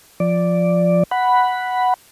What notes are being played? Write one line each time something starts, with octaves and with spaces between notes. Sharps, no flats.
F3 D5
F#5 B5